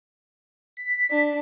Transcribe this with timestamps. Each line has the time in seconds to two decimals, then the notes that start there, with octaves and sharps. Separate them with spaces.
0.77 B6
1.10 D4